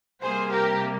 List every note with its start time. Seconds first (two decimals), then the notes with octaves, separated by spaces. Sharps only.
0.22 C3 G3 A#3 G#4 C5
0.51 G4 A#4